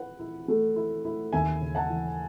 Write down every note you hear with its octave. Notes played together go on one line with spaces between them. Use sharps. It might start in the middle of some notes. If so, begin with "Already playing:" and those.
Already playing: E4 B4 F#5
E4
A3
E4
E4
D#2 E5 G#5
C#3
F#5 A5
E3